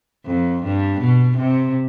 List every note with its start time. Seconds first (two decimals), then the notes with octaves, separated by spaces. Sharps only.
0.26 F2
0.63 G2
1.00 B2
1.37 C3